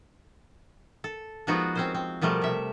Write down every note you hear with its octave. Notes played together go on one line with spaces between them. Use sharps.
A4
F3 G#3 B3 D#4 F4 F#4
C4 C#4 C5
C4
B2 F3 G3 A3 A#4
C3 E5